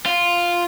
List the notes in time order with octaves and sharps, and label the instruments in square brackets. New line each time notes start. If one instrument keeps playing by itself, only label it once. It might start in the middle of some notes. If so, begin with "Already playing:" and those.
[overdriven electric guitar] F4